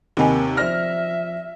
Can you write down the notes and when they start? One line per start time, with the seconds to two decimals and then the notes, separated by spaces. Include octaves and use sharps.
0.17 D#2 C3 C4 A#4 D#5 F#5 G#5 B5
0.57 F3 C5 D5 E5 F6 A#6